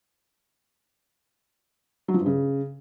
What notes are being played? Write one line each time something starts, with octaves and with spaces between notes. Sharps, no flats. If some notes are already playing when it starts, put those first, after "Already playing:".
F#3
F3
G2
C#3